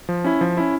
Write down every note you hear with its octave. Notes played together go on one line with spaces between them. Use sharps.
F3
C#4 E4
F3
C#4 E4